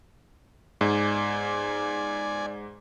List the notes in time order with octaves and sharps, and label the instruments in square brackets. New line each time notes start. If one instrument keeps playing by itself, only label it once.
[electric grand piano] G#2 [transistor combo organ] D5 G#5